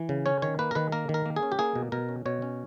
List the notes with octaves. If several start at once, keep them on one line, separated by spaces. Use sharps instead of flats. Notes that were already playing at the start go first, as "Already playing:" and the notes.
Already playing: E3
C#3
C#4 C#5
D#3 C#5
A#3 B4
A#4
D#3 B4
A#3 A#4
D#3
A#4
A#3
G#4
C#4
G4
A#3 G#4
B2
B2 A#4
C#4
B2 C#5
C#4